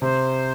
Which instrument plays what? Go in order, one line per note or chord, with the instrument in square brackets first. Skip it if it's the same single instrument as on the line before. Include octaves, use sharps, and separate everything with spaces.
[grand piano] C3 [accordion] C5